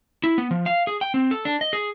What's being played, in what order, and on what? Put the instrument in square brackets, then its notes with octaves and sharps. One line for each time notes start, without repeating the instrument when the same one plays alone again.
[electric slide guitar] E4
B3
F3
F5
G#4
G5
C4
A4
D4
D#5
G#4